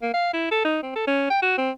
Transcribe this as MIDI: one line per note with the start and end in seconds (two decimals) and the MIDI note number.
0.02 0.11 58
0.14 0.31 77
0.33 0.50 64
0.51 0.60 69
0.65 0.78 63
0.83 0.94 60
0.96 1.04 69
1.07 1.25 61
1.30 1.42 79
1.42 1.54 66
1.58 1.71 60